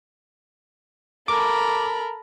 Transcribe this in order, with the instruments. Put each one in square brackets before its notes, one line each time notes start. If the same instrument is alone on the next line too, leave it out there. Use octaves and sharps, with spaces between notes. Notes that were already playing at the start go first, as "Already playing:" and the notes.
[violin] A4 B5 [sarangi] A#4 [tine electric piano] D6